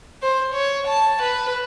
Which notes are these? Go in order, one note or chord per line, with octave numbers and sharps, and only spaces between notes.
C5
C#5
A5
B4